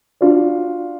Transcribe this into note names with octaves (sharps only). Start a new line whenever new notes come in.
D4 F4 F#4 D5